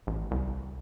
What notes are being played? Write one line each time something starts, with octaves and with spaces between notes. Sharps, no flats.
A1
C2